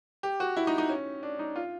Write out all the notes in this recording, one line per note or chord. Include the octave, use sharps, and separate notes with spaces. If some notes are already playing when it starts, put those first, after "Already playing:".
G4
F#4
E4
D#4
D#4
C#4
D4
D#4
F4